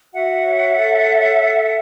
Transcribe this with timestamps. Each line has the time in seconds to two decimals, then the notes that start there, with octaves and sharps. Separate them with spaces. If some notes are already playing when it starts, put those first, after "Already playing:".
0.13 F#4 E5 F#5
0.44 C#5
0.75 A4
1.06 C#5
1.36 A4